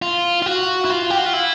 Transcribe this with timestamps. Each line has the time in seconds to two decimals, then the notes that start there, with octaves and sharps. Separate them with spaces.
0.02 F4
0.42 F4
0.46 F#4
0.85 E4
0.90 F4
1.10 G4
1.18 F#4
1.26 F4
1.33 E4